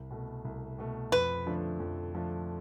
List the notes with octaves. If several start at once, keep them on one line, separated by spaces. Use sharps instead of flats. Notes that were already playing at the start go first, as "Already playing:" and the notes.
Already playing: C2
B2 A3
C2
B2 A3
F2 B4
D3 F3 A3 D4
F2
D3 F3 A3 D4